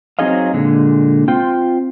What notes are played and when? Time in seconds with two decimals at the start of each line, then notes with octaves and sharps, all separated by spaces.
0.19 F#3 C4 D#4 G#4 D#5 F5
0.53 A#2 D3 G#3
1.28 C4 F4 G5